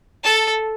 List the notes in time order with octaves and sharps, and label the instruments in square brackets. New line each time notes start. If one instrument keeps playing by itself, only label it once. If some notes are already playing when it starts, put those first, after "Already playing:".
[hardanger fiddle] A4 [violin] A5